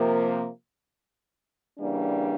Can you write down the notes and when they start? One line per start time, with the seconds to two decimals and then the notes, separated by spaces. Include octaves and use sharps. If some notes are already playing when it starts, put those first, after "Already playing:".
Already playing: C3 F3 A#3
1.78 C#3 E3 G3 A#3 D4